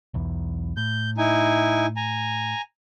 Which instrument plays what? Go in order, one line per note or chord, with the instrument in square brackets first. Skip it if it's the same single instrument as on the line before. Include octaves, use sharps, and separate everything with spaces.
[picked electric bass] B1 E2
[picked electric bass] A2 [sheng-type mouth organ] G6
[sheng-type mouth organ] D#4 E4 G#5
G#5 A#5